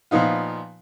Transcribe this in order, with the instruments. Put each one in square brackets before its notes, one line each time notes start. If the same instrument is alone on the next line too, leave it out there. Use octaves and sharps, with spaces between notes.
[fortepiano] A#2 F3 B3 D#4 F4